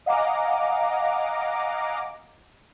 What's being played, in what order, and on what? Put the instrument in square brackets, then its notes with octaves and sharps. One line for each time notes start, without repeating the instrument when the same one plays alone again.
[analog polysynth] D#5 F5 F#5 G#5 A#5 D6